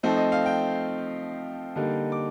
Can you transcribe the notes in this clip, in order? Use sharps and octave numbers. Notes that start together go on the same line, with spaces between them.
F3 A3 C4 D#4
D#5
F5
G5
D3 G3 A#3 D#4
D6